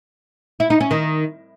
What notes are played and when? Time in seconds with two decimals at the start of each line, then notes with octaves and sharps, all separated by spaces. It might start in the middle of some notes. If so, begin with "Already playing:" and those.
0.60 E4
0.70 D#4
0.80 C#4
0.91 D#3